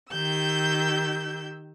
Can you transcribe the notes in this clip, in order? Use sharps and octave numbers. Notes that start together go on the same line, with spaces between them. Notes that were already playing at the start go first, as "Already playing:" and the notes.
D#3 G4 E6 G6